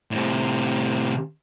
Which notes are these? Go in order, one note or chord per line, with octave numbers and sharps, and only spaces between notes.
A2 C3